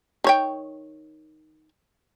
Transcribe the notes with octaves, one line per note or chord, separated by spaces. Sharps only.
D#3 C#5 G5